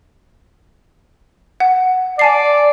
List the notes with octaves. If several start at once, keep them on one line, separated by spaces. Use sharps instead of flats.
F#5
D5 G#5 A5 C7